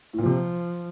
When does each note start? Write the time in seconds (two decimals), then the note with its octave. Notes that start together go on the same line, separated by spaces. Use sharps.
0.13 A2
0.18 A#2 F3
0.26 C3